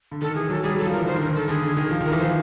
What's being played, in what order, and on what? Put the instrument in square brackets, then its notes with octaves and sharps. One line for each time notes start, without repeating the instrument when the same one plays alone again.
[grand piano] D3
[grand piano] D#3 [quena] A4
[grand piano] E3 [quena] G#4
[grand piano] F#3 [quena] A4
[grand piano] G3 [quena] G#4
[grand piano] F#3
[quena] A4
[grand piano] F3
[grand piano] E3 [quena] A#4
[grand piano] D#3 [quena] C5
[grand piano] D3 [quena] A#4
[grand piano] D#3
[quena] A4
[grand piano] D3 [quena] G#4
[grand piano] D3
D#3
F3
D#3
[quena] A#4
[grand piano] E3
[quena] C5
[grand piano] F3